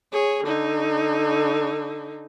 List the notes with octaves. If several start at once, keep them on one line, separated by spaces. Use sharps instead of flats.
G#4 C#5
D3 D#4